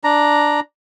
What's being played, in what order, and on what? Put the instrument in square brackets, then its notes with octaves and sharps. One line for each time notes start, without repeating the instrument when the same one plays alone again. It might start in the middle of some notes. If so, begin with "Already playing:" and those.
[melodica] D4 A#5